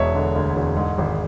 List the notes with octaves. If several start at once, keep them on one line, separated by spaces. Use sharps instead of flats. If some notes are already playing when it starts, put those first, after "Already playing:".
Already playing: E1 B2 G#3 C#5 E5
D3
D2
E1
G#2
G#1